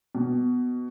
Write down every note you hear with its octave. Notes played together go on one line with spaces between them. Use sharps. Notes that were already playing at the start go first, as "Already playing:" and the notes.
B2